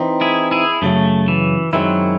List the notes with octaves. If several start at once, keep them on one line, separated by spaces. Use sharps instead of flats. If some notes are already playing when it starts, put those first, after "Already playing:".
Already playing: E3 C4 D#4
E4 G#4
E4 G#4
F#2 C#3 F#3 A3
E3
F#2 D#3 F#3 G#3 C4 E4